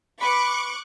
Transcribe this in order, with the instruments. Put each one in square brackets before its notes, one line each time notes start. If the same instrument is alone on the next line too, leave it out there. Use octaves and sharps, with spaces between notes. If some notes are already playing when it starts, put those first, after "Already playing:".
[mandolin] B4 B5 [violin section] C#6 D6 F#6